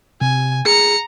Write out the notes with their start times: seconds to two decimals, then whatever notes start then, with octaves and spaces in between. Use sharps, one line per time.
0.21 C3 G#5
0.66 G#4 A#5 C#7